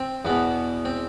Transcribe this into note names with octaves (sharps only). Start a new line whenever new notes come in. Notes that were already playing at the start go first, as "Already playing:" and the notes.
Already playing: C4
E2 B2 B3
C4